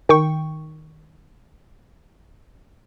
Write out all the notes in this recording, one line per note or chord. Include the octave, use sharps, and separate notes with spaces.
D#3 G5 C#6